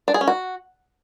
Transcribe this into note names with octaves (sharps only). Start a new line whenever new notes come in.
D4
G#4
C#4
F#4